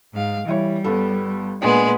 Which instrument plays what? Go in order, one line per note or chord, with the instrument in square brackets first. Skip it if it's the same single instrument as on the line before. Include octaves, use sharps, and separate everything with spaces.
[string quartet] G#2 F5
[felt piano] E3 E4 C#5 [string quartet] G3
[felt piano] G1 B3 A4
[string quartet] A#2 G#3 B3 [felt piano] D4 G#5